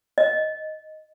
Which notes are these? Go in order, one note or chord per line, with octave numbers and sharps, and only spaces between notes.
D#5